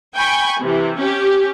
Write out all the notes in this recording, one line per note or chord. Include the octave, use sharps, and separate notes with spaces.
G5 G#5 B5 C#6
C3 E3
C#4 G4